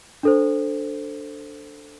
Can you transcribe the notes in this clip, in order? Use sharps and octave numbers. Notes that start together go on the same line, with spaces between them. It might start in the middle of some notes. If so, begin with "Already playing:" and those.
D4 A4 C5